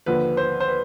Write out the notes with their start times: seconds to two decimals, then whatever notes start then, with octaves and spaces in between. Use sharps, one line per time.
0.06 D#2 D3 F3 B4
0.37 C5
0.60 C5
0.68 B4